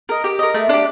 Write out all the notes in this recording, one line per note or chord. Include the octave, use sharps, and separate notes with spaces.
A#4 D#5
G4
A#4 D#5
A3
D4 G4